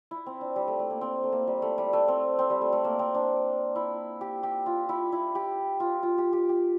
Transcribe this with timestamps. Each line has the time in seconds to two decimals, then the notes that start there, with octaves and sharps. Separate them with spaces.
0.11 E4
0.26 C4
0.41 D4
0.56 G3
0.68 A3
0.80 A3
0.90 A#3
1.01 C4
1.24 A3
1.32 A#3
1.47 G3
1.62 A3
1.78 G3
1.93 A3
2.08 C4
2.39 C4
2.50 G3
2.61 A3
2.73 A3
2.84 A#3
2.99 C4
3.15 D4
3.76 E4
4.21 G4
4.43 G4
4.66 F4
4.89 E4
5.12 E4
5.35 G4
5.80 F4
6.03 F4
6.18 G4
6.33 G4
6.49 G4